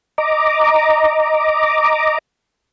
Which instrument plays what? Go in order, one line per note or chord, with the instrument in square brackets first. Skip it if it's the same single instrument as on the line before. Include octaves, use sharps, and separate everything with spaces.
[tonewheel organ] D#5 A#5 D6